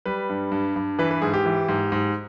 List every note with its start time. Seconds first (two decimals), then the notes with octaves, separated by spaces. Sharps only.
0.05 G3 B4
0.29 G2
0.52 G2
0.76 G2
0.99 E3 B4
1.11 B4
1.22 G#2 G#4
1.33 G4
1.45 E3
1.69 G#2
1.92 G#2